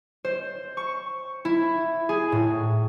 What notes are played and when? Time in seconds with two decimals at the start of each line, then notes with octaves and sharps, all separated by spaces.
0.25 C5
0.77 C#6
1.45 E4
2.09 G#4
2.32 A2